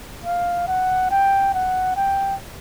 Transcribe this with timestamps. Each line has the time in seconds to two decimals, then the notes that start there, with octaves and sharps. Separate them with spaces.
0.24 F5
0.67 F#5
1.11 G5
1.54 F#5
1.96 G5